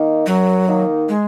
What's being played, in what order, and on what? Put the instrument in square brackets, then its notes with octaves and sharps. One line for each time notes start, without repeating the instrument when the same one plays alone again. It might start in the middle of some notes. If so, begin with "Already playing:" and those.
Already playing: [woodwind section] D#3 A#3 D#4
[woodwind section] F#2 [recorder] F#3
[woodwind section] D#3 A#3 D#4
[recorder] G#3